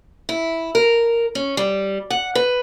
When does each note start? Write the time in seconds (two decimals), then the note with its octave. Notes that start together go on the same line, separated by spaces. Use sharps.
0.29 E4
0.75 A#4
1.35 C#4
1.57 G3
2.10 F#5
2.35 B4